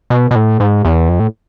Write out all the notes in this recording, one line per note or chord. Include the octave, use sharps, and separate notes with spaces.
B2
B2
A2
G#2
E2
F2
A2